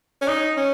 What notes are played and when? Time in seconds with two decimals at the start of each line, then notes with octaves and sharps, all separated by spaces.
0.22 C#4
0.28 D#4
0.57 C#4